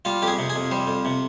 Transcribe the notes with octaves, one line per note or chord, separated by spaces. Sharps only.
G3 F4
F2 G4
G#4
C3
G#4
F2
G3 C5
F2
C3